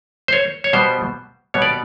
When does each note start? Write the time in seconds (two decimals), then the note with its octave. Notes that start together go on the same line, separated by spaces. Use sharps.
0.28 C5
0.33 C#5
0.64 C#5
0.73 B2 G3 B3 C5
1.54 B2 G3 B3 C#5
1.62 D5